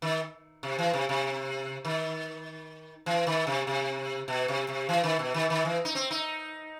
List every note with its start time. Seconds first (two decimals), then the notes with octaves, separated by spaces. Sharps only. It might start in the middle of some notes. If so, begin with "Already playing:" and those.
0.02 D#3
0.63 C3
0.79 E3
0.93 C3
1.09 C3
1.85 D#3
3.06 E3
3.27 D#3
3.47 C3
3.67 C3
4.28 B2
4.48 C3
4.69 C3
4.89 E3
5.04 D#3
5.19 B2
5.34 D#3
5.50 D#3
5.65 E3
5.85 D#4
5.95 C4
6.11 D#4